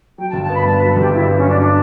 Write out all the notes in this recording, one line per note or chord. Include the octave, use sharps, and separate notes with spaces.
F#3 G5
A5
G1
A5
B3 B5
G2 A5
F#3 B4
A4
G1 G4
B3 E4
G2
C#4
F#3 D4
D4